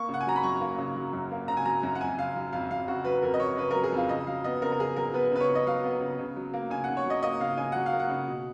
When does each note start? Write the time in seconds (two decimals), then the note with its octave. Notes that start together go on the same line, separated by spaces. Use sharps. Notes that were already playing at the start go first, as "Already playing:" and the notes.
Already playing: A#3 C#6
0.09 C#3 F#5
0.21 G#5
0.27 F#3 A#5
0.36 B5
0.43 F#2 C#6
0.61 A#3
0.78 C#3
0.96 F#3
1.13 F#2
1.32 A#3
1.48 C#3 A#5
1.57 G#5
1.65 F#3 A#5
1.83 F#2
1.95 F#5
2.00 F2 G#5
2.18 C#3 F5
2.36 F#3
2.53 F2 F5
2.71 F2 F5
2.87 C#3 F#4
3.05 F#3 B4
3.22 F2 A#4
3.34 D#5
3.40 F2 C#5
3.57 C#3 B4
3.71 F#3 A#4
3.84 G#4
3.92 F2 F4
4.09 C#3 D#5
4.27 F#3 F5
4.44 B3 D#5
4.62 C#3 A#4
4.72 A#4
4.79 C#3 G#4
4.96 F#3 A#4
5.14 B3 B4
5.31 C#3 B4
5.41 C#5
5.50 C#3
5.55 D#5
5.67 F#3 F5
5.84 B3
6.01 C#3
6.19 C#3
6.36 F#3
6.54 A#3
6.70 C#3 G#5
6.84 C#3 F#5
6.97 C#5
7.06 F#3 D#5
7.23 A#3 D#5
7.40 C#3 F5
7.57 C#3 G#5
7.72 F#3 F#5
7.86 F5
7.93 A#3
8.00 F#5
8.10 C#3
8.28 B2